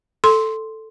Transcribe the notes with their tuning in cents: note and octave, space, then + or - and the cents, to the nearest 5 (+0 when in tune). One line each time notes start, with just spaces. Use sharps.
A4 +0 C6 +0